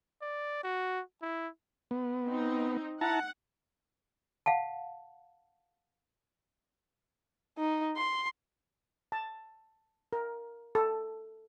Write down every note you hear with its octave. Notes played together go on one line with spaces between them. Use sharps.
D5
F#4
E4
B3
C4 D#4
E4 F#5 A5 A#5
F5 F#5 A5
D#4
C6
A5
A#4
A4